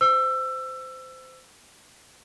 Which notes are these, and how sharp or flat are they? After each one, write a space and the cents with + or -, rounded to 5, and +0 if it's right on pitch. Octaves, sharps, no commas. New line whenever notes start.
C5 -20 E6 +25